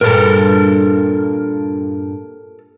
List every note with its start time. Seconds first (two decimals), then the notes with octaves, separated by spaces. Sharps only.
0.01 G2 A#2 A4 A#4